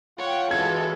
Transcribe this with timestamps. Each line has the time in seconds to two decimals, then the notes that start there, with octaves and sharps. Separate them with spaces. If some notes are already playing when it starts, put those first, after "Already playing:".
0.19 F4 C#5 F#5 G5
0.51 E3 G#3 F#4 A4 G#6